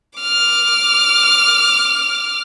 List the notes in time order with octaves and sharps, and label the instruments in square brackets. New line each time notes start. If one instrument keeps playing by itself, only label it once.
[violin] D6 F6